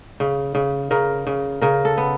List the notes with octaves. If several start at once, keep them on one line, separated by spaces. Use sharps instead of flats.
C#3
C#3
C#3 A#4
C#3
C#3 A#4
A4
B3